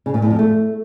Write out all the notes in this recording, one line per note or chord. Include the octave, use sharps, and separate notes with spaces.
C#3
A#2
A2
F2
A3